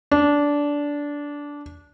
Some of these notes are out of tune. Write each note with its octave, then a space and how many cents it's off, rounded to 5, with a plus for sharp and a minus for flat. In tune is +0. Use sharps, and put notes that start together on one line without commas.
D4 -15